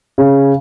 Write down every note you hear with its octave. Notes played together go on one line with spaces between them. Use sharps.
C#3